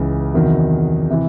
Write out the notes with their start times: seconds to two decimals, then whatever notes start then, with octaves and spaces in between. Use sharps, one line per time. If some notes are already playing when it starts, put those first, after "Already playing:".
Already playing: C#2 C#3 E3
0.34 E2 C3 D#3 F#3
1.10 C3 E3